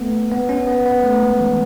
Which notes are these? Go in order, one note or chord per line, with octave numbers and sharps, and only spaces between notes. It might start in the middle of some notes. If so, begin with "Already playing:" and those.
Already playing: A3 B3
B3
C#4
B3
B3
A3
G#3
E3